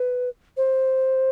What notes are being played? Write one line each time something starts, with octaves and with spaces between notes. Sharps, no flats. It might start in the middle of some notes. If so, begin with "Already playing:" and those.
Already playing: B4
C5